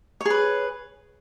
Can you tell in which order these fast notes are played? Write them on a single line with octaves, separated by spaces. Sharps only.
C#5 G#4 B4